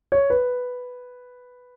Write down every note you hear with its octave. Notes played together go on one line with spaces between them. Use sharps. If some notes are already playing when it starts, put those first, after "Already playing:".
C#5
B4